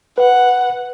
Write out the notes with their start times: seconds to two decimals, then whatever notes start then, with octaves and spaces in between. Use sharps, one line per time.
0.18 B4 F#5